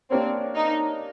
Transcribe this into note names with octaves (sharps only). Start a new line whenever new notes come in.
A#3 C4 D4 G4 A#4 C#5
D#4